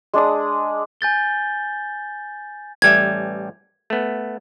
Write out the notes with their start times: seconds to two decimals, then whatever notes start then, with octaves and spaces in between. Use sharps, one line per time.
0.14 G#3 D4 D5 D#6
1.01 G#5 G6 A6 G7
2.82 A1 G3 E5 G#6
3.90 A3 B3